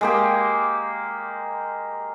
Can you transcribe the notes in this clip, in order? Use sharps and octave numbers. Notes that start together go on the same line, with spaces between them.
G#3 A#3 G4